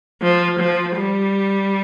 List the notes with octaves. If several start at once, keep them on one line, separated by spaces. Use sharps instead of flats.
F3
F3
G3